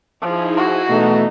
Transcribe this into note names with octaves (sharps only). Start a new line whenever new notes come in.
F3 D#4 E4 G#4
F#4
B2 E3 A3 D#4